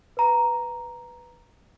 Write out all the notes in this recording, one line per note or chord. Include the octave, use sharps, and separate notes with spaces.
B4 A#5